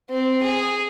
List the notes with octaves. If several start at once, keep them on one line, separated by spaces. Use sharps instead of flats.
C4
G#4